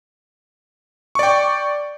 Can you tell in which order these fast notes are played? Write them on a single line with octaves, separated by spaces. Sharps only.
C#6 D5 G5